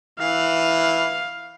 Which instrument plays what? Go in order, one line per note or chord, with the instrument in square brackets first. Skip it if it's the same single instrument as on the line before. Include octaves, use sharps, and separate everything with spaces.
[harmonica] E3 E4 [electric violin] F5